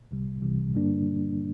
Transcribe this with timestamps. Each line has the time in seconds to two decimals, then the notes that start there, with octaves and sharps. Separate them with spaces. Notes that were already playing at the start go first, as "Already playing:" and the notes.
0.11 C2 C3 G3
0.42 C2 C3 E3 G3
0.74 G2 D3 G3 A#3 D4